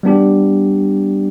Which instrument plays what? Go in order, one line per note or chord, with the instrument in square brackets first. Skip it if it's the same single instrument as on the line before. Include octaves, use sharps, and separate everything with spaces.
[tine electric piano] G3 B3 D4 G4